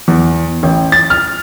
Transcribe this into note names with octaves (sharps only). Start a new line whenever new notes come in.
E2
A1
A6
F6